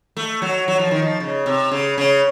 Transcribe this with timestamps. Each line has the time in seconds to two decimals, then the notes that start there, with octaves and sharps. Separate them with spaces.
0.17 A3
0.42 F#3
0.68 F#3
0.79 F3
0.91 D#3
1.02 F3
1.20 C#3
1.46 C3
1.71 C#3
1.98 C#3